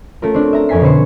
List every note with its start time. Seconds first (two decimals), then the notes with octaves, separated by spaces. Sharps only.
0.22 A3 C#4 F4 A#4
0.34 C4 D4
0.53 E5 A#5
0.69 F2 C#4 A#4 G#5 B6 C7
0.81 B2 D3 C4 B4 C5 C#7